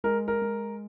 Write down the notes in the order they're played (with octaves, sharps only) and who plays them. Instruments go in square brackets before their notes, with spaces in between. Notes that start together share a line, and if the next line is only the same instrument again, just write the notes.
[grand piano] G#3 A#4
A#4
G#3